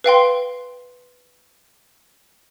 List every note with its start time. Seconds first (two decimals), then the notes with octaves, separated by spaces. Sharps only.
0.04 B4 F5 G5 C6